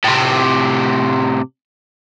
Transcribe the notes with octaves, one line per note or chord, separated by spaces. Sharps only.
A2 C3